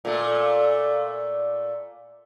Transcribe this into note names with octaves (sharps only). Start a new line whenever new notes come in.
A#2 A3